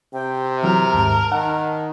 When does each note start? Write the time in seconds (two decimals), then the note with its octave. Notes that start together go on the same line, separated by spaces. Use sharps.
0.13 C3 G5
0.63 E3 F#3 C4 A#4
0.94 D#2 G#2 A5
1.32 D#3 F#5